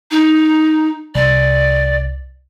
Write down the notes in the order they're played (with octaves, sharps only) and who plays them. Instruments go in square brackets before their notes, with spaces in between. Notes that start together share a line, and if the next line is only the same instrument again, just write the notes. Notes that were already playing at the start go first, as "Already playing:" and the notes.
[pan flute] D#4
[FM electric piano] C2 [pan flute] D5